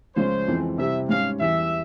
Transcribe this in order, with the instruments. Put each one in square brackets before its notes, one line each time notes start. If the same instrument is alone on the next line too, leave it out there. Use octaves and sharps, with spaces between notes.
[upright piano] C#2 C#3 F3 G#3 C#4 [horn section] C5
[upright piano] F2 E3 G#3 C4
[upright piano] C3 G3 C4 E4 [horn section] E5
[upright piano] G#2 G3 C#4 [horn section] F5
[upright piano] E2 E3 G3 [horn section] E5